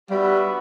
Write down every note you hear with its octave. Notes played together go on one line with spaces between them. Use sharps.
G3 B3 D4 F#4 B4 E5